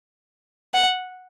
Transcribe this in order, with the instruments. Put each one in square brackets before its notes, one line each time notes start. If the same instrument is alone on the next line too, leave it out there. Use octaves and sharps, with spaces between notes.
[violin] F#5